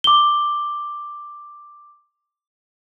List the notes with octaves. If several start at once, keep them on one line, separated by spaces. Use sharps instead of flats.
D6 G7